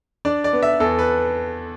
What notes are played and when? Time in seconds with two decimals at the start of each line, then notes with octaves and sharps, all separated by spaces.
0.25 D4 D5
0.44 D5
0.53 B3
0.62 E5
0.80 E2 A4
0.99 B4